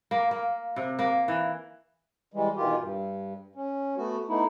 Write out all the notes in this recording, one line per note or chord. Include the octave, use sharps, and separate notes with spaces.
A#3
A#3
C3
A#3
E3
E3 G3 G#3
B2 D#3 E3 F4 G4
G2
C#4
A3 B3 F#4
A3 B3 D#4 E4